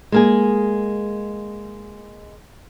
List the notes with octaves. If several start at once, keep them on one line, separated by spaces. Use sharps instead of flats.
G#3 A#3 G#4